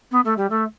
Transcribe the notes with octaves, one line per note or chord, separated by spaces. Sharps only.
B3
A3
G3
A3